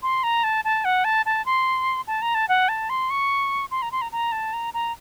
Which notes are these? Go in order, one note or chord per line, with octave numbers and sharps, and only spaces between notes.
C6
A#5
A5
A5
F#5
A5
A5
C6
A5
A#5
A5
F#5
A5
C6
C#6
C6
A#5
C6
A#5
A#5
A5
A#5
A#5